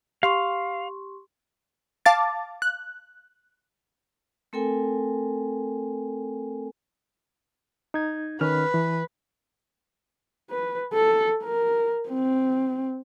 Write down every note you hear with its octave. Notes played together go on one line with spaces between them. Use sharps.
G4 F5 C6 C#6
F5 A5 D6 A6
F#6
A3 C4 A4 A#4 G5 G#5
D#4 G#6
D#3 C#4 B4 F6
E3
B4
A4
A#4
C4